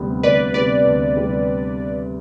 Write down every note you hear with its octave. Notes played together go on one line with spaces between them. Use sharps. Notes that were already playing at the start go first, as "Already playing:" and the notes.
Already playing: D2 C3 G3 B3
D2 B4 D5
C3 G3 B3 B4 D5
D2
C3 G3 B3